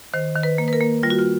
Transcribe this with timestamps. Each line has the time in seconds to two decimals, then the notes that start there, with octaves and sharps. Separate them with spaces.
0.13 D#3 C5
0.35 D#3
0.43 B4
0.58 A#3
0.68 B4
0.73 A#4
0.80 A#3
1.03 G3 F4
1.10 F#4
1.19 F4